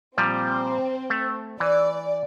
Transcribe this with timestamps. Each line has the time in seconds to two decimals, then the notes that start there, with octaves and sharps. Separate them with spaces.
0.18 A#2 F3 G3 C4
1.10 A3
1.60 E3 D5